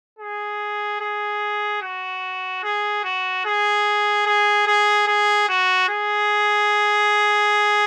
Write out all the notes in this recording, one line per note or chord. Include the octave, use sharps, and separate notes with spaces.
G#4
G#4
F#4
G#4
F#4
G#4
G#4
G#4
G#4
F#4
G#4